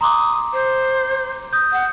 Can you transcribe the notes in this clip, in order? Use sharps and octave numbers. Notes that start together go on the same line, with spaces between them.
A#5 C6 D6 D#6
C5
D#6 G6
F#5